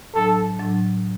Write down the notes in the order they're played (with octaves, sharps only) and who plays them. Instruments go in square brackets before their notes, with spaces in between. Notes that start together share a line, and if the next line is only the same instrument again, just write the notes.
[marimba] A2 F#3 D4 [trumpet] A4
[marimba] A2 F#3 D4